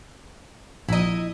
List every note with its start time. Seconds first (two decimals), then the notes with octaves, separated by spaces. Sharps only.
0.89 A#1 E4 D#5 A#5